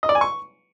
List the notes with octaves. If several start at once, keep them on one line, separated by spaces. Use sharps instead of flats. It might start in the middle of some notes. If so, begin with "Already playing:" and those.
D#5
D5
G#5
C#6